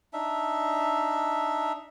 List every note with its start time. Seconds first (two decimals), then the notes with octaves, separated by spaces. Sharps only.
0.13 D4 D#4 E5